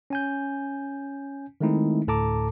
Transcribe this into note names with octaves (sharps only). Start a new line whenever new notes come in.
C#4 G#5 G6
D#3 G#3 A3 C4 D#4 E4
D2 A2 A4 A5 A#5 D6